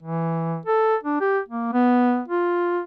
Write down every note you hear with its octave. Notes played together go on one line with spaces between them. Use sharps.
E3
A4
D4
G4
A#3
B3
F4